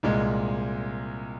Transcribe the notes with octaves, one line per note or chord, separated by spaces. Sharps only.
C2 A#2 G#3